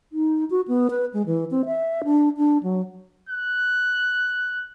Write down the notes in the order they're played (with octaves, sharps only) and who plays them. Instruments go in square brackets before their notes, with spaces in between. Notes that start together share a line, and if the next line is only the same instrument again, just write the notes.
[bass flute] D#4
F#4
B3
B4
G#3
E3
C4
E5
D4
D4
F#3
[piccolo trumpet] F#6